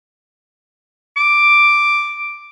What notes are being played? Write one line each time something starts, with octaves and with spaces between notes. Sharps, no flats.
D6